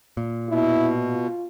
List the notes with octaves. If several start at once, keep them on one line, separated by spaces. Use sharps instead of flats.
A#2
B2 E4
F4